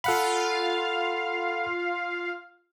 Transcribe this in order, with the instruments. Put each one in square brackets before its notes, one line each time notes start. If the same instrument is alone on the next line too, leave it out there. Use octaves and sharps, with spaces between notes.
[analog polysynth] F4 F5 [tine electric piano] A4 F#5 B5